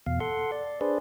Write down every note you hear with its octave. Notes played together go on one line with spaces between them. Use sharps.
E2 B2 F5
A4 F#5 C6
D5
D4 G#4 B4 C5 D5